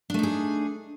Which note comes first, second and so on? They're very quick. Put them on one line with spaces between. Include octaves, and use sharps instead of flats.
D4 A3 D#4 G#4